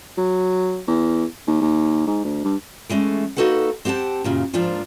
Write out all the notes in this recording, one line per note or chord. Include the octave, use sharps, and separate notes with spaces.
F#3
E2
D#2
D#2
G#2
D2
G2
E3 G#3 A3 C#4
A#3 D#4 F#4 A4 B4 F#5
C4 G4 F#5 G5 A5
F#2 A#2 C#3
G#2 F3 A#3 D4 F4